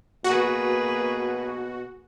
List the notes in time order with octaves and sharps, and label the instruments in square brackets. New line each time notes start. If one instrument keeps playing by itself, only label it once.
[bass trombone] B2 [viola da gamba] A#3 G#4 B4 [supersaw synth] F#4